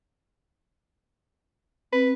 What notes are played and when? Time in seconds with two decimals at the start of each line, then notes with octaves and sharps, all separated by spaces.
1.93 C4 B4